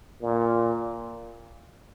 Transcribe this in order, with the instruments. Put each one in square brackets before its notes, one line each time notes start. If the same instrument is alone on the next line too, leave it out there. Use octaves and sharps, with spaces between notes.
[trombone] A#2